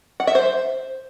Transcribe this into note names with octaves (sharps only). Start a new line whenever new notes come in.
F#5
E5
C5